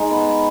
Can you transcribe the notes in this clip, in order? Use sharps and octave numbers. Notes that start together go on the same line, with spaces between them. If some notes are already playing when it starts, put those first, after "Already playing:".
Already playing: G#3 D#4
B3